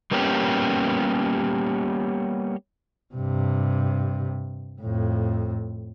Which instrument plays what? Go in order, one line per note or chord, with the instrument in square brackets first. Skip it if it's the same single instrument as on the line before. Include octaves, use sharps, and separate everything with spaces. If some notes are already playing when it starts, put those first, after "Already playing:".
[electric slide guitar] G3 A#3 B3 C#4 F#4 G4
[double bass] G2 C3
F2 A2